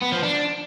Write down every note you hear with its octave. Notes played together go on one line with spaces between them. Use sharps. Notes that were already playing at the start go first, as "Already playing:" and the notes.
B3
F3
D4